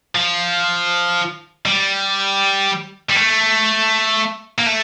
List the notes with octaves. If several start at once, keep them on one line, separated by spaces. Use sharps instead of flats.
F3
G3
G3
A3
A#3
A3